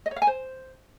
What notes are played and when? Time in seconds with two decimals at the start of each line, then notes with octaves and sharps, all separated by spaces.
0.06 D#5
0.11 C#5
0.16 F5
0.22 G#5
0.27 C5